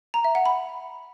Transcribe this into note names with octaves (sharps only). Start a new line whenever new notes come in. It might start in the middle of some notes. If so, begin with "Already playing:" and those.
A#5
E5
F#5
B5